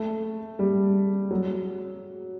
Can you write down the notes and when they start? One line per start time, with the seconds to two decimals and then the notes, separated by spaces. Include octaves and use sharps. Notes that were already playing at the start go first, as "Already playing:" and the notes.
Already playing: A3
0.59 G3
1.31 F#3